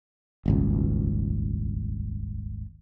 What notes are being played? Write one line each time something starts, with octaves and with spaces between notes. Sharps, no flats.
D#1 G#1 C#2